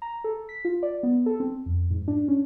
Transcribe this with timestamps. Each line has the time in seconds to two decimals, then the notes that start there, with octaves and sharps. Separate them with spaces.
0.02 A#5
0.24 A4
0.49 B6
0.65 F4
0.83 D5
1.03 B3
1.26 A4
1.40 C4
1.66 F2
1.90 G#2
2.08 D4
2.28 C#4